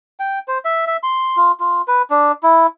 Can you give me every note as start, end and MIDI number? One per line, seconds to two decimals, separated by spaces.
0.20 0.39 79
0.48 0.58 72
0.65 0.85 76
0.87 0.97 76
1.03 1.36 84
1.36 1.52 65
1.60 1.82 65
1.88 2.02 71
2.10 2.32 62
2.43 2.67 64